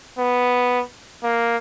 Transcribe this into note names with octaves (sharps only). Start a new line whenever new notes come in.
B3
A#3